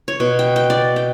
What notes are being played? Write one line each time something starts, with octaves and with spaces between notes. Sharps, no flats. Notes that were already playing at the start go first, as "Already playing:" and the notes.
C#5
B2
G5
G5
D5
G5